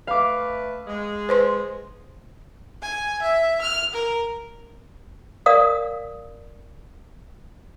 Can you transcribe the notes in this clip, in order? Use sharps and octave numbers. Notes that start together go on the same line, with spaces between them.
A3 B4 F5 D6
G#3
B4 C5 C6
G#5
E5
F6
A#4
A#4 D5 F5 D#6